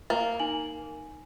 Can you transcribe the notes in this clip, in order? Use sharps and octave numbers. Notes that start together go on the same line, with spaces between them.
A#3 A6
D#4 G#5 F#7